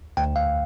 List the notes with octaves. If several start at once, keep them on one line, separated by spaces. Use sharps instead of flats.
D2 G5
F5